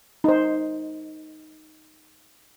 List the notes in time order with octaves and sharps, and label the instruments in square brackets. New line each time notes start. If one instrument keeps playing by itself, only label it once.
[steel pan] D#4 C5